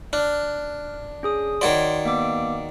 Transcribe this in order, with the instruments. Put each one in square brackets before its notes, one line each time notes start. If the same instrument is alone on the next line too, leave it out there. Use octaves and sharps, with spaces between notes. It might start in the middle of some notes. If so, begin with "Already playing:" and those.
[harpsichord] D4 [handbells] F6 F#6
[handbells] C#4 G#4 D#6
[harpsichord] D#3 F#4 D5 [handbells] C#5 C6
[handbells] A#3 B3 D6